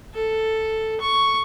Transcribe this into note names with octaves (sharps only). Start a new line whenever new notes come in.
A4
C#6